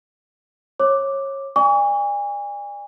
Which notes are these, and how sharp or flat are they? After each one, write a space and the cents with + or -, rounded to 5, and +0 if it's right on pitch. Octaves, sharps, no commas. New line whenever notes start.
C#5 -25 D6 +0
D5 +15 G#5 -35 C#6 +40